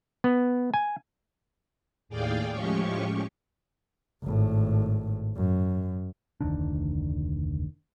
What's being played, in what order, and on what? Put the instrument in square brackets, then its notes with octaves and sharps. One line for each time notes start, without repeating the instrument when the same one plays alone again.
[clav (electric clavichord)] B3
G#5
[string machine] D#2 A2 G#4 D5 F5 G5
A2 F3 G#3 C#4 G4 C#6
[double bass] G#1 A2
F#2
[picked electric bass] F1 D2 D#3 D4